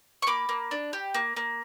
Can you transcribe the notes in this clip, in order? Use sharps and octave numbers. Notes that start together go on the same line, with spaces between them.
C#6
A#3 B5 D6
A#3
D4
G4
A#3
A#3